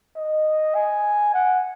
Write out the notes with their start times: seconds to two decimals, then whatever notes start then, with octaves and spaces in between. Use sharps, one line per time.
0.16 D#5
0.75 G#5
1.34 F#5